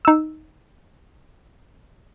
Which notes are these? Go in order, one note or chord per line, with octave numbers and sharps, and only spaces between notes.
D#4 E6